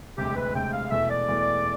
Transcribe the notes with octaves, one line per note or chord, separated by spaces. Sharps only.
E1 D2 C3 G4
B4
E1 D2 C3 G5
F5
E2 B2 A3 E5
D5
E2 B2 A3